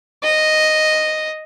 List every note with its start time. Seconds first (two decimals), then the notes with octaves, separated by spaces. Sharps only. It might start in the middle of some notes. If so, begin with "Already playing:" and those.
0.24 D#5